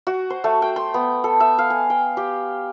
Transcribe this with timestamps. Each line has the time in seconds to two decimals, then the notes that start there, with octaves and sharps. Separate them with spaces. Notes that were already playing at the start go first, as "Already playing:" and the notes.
0.07 F#4
0.30 C5
0.44 A3
0.62 G5
0.76 C6
0.94 B3
1.24 A4
1.40 E5
1.58 F5
1.70 G#5
1.90 G5
2.17 G4